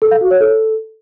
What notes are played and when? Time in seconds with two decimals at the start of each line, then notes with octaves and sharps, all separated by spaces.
0.02 A4
0.11 F5
0.21 F#4
0.31 C#5
0.40 A4